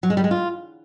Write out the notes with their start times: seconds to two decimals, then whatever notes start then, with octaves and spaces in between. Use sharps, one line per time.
0.03 F#3
0.10 G#3
0.17 G3
0.24 G#3
0.31 F4